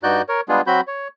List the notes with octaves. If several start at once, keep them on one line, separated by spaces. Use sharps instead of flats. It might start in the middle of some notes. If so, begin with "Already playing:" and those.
G2 D#4 F#4 D5 F#6 G6
A#4 C#5
G3 G#3 B3 D4 F4 G#4
F#3 C4 F#4 B5 G6
C#5